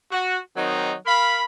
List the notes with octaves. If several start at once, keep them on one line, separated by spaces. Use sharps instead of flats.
F#4
D#3 F#3 C4 D#4
A#4 F5 B5